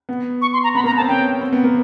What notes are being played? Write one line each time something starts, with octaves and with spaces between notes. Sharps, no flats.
B3
C#6
C6
A#5
B3 B5
A#3 A#5
B3
A5
C4
C#4 G5
C4
B3
A#3